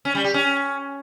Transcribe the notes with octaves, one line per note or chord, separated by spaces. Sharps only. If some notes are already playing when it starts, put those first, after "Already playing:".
C#4
G3
G4
C#4